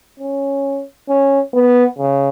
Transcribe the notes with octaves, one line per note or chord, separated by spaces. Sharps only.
C#4
C#4
B3
C#3